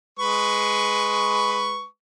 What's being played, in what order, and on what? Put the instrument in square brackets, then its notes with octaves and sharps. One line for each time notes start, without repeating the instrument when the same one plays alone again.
[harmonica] G#3 B4 C#6